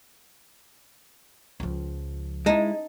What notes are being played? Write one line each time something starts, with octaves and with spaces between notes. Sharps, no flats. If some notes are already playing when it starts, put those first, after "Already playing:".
C#2 F3
G#3 D#4 E4 A5